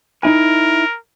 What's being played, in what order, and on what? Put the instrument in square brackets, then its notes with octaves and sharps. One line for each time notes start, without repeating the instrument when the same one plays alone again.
[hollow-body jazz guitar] D#4 E4 G#5 [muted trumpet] A#4